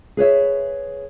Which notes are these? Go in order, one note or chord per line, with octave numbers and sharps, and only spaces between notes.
G#4 B4 C#5 E5